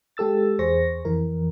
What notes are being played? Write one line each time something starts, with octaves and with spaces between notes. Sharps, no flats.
G#3 G4 A4 E6 A6
E2 G#4 C5 C#6 A#6
F2 E3 A#4